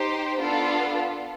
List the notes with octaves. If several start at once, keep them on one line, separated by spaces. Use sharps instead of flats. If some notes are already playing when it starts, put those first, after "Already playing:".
Already playing: D#4 G4 C5
B3 D4 F4 A4